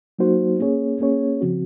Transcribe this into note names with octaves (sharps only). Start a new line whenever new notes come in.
F#3 A#3 D#4 F#4 C5
A#3 C#4 G#4 C#5
A#3 C#4 G#4 C#5
C#3 F3 C4 F#4